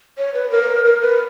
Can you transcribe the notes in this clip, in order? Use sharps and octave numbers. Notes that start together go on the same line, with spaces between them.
C#5
B4
A#4
A#4
B4